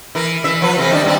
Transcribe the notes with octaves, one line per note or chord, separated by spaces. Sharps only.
E3 A#4
E3 E5
F3 B4
C3 E3 A3
D#3 G3 D4
G2 G3 C4